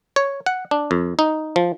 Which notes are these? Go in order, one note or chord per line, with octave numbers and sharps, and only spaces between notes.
C#5
F#5
D4
F2
D#4
F3